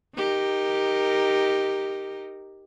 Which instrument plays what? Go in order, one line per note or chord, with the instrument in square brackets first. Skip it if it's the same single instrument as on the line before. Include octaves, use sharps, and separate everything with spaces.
[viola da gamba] D#4 G4 A#4